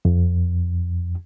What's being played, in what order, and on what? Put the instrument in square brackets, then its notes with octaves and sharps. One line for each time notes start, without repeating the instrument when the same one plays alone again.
[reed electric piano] F2